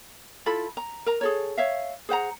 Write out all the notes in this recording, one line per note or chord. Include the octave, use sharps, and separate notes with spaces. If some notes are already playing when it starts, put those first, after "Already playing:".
E4 F4 A4 B5
A#5
A#4 A#5
G#4 A4 C#5
C#5 E5 F5
G#4 C5 F#5 A#5